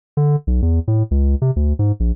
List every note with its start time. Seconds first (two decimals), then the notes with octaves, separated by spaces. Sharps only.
0.17 D3
0.47 B1
0.62 E2
0.88 A2
1.11 C#2
1.42 C3
1.56 D2
1.79 G#2
2.00 A#1